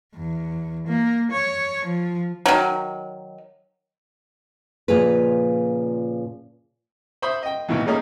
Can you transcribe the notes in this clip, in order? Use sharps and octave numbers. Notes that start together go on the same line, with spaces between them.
E2
A#3
C#5
F3
D#3 F#3
A#2 C#3 F3 G#4 A#4 B4
C5 E5 B5 C#6 D#6
D#5 G5
D#2 B2 D#3 E3
G3 A3 A#3 C#4 D#4 G#4